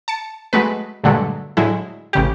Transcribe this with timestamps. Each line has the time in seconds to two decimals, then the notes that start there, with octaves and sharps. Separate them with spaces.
0.08 A5 C#7
0.53 F#3 G#3 A3 B4
1.04 G2 A#2 D3 F#3 G#3 A3
1.57 A2 D3 F#3 G#3 E4
2.13 A1 C#3 G4